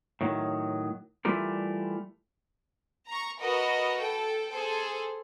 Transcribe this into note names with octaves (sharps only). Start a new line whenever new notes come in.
A2 D#3 F#3
E3 G3 A3 F4 G4 A#4
A#5 C#6
F#4 A#4 B4 D#5
A4 G5
G#4 A4 C5